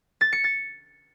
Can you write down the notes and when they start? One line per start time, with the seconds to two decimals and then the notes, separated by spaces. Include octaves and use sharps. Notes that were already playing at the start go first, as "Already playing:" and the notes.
0.21 A6
0.32 C#7
0.44 A6